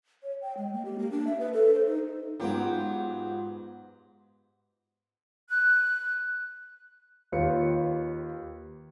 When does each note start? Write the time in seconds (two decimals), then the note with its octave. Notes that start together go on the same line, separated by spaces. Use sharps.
0.23 C#5
0.42 G5
0.57 G#3
0.73 A#3
0.85 G4
0.99 A#3
1.12 D4
1.27 E5
1.40 B4
1.54 A4
1.74 C5
1.86 D#4
2.40 G#2 F#3 B3 F4 G4
5.49 F#6
7.32 D#2 F4 G4 B4 C#5 C#7